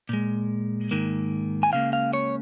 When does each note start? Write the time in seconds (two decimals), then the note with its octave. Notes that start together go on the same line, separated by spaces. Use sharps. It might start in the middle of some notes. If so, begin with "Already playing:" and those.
0.09 A#2 G#3
0.91 G#2 D#3 A#3
1.63 G#5
1.72 C#2 C#3 A#3 F5
1.93 F5
2.13 C#5